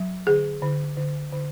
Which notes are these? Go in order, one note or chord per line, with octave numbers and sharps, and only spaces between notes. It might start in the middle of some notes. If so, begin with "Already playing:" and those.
Already playing: F#3
D3 G#4
D3
D3
D3